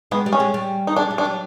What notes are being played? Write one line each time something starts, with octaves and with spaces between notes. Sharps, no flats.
G#3 B3
G3
C#4
G#3
G3
D#4
G#3 D4
G3
D4
F#3